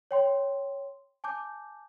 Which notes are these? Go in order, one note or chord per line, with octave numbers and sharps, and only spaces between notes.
C#5 G5 C6
G#5 A5 D6 G6